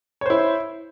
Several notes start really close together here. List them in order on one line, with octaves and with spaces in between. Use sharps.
C#5 C5 E4